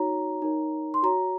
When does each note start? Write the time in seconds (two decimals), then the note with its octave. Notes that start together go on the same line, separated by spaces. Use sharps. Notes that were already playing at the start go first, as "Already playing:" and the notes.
Already playing: D#4 F#4 C#5 A#5
0.42 D#4 A#4 C#5
0.94 C6
1.03 F#4 C#5 A#5